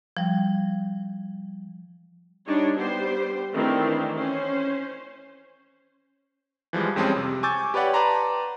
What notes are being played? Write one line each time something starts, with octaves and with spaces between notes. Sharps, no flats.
F3 G3
G3 D4 D#4 C#5
G3 B3 G4 C5
D#3 E3 A3 C4 D4 E4
C#4 C5
E3 F3 G3 G#3
F2 G3 G#3 C4 C#4 G#4
C3
G#5 C#6 D6 E6 G6 A6
G4 B4 C#5 D5 F#5 G5
B4 D5 A5 A#5 C6